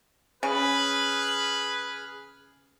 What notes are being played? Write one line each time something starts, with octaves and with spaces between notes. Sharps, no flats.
C#3 G#4 B4 F6